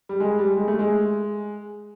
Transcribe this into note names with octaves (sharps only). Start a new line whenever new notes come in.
G3
G#3
G3
G#3
A3
G#3